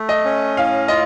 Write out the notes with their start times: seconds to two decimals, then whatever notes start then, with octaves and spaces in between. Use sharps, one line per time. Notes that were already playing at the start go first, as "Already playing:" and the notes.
Already playing: A3
0.09 D#5
0.25 C#4
0.57 A2 F5
0.88 F4 D#5